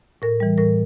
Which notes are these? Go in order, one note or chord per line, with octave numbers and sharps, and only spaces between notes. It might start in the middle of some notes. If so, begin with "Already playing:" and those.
A2 A#4
E3 G3
A2 A#4